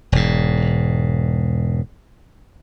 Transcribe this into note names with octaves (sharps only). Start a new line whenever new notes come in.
E1 G#2